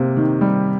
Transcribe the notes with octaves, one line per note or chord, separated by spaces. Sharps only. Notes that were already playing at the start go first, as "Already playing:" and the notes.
Already playing: C3 A#3
D#3
G3